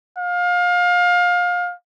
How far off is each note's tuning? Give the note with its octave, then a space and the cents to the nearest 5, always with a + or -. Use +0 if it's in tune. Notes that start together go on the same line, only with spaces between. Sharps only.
F5 +25